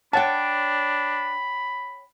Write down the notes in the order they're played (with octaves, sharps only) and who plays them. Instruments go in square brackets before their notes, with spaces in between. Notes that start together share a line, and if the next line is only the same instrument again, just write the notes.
[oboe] D4 [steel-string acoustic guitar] C#5 G5 [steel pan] F#5 A5 [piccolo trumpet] B5